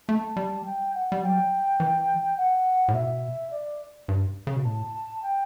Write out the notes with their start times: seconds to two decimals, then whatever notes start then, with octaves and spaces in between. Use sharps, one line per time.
0.08 A3 A5
0.37 G3
0.65 G5
0.94 F#5
1.12 G3
1.23 F#3 G5
1.80 E3
2.37 F#5
2.88 A2
2.94 B2 E5
3.51 D5
4.08 G2
4.47 C#3
4.56 B2
4.65 A2 A5
5.22 G5